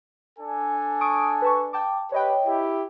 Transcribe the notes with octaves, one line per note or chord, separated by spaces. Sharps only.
D4 A4 G#5
C#6 D#6 D7
B4 A5 C#6
G5 A5 D6
G4 B4 C#5 D#5 G5
E4 G4